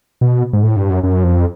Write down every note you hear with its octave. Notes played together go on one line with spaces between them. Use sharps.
B2
G#2
A2
G2
F#2
F#2
F2